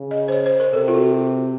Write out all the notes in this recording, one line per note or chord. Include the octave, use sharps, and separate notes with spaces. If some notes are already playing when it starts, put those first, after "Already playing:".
Already playing: C#3
D#5
C5
C#5
C5
A#4
C3 A4
F4
F#4